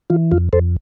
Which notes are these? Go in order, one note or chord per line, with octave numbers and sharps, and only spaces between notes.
E3 F4
F2 F4
F2 A4 C5